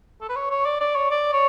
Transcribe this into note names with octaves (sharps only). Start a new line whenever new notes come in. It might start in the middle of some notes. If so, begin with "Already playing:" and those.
A4
B4
C#5
C#5
D5
D5
C#5
D5
C#5